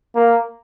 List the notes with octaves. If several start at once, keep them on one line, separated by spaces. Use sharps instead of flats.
A#3